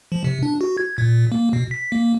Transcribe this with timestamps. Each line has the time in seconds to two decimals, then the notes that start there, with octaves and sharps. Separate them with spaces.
0.12 F3
0.24 C3
0.43 D4
0.61 F#4
0.77 G#6
0.98 A#2
1.32 A#3
1.53 B2
1.71 B6
1.92 A#3